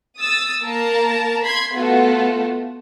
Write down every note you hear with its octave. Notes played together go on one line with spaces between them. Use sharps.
D#6 E6 A6
A#3 A#4 A5 A#5
B5 C6 G#6
A3 B3 F4 F#4 A4